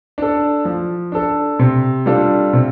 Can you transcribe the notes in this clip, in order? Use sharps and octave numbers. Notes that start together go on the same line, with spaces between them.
D4 A4
F3
D4 A4
C3
G3 D4 F4 A4
C3